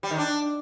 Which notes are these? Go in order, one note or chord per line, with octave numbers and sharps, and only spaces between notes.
G3
D#3
D4